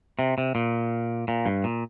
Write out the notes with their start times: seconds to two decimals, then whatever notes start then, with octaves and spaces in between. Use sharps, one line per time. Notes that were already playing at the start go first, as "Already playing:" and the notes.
0.19 C3
0.38 C3
0.55 A#2
1.28 A#2
1.46 G2
1.64 A#2